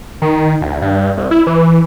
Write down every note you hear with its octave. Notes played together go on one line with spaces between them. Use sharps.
D#3
D2
G2
C2
E4
E3